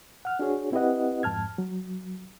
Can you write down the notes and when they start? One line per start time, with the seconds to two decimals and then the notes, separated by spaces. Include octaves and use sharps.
0.25 F#5 F6
0.39 D4 F#4 G#4 C#5
0.72 C4 E4 G4 B4 D#5 F#5
1.23 F2 G#2 A5 F6 G#6
1.58 F#3